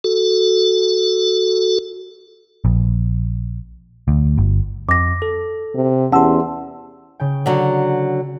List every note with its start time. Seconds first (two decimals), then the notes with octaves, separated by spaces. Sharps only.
0.04 F#4 A4
2.65 A#1
4.08 D2
4.37 G1
4.89 F2 D6 A#6
5.22 A4
5.75 C3
6.12 E2 C#4 G4 F#5 A5 C6 E6
7.20 C#3 G5
7.46 D3 F#3